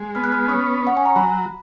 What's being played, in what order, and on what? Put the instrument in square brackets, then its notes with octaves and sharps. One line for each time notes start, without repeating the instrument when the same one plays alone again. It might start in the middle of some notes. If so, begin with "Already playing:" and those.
Already playing: [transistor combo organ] G#3
[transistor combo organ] B3 [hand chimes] F6
[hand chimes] F#6
F6
[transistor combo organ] C#4 [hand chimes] D#6
[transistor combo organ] C#4 [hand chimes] F#5
[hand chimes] G#5
A#5
[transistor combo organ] F#3 [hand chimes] B5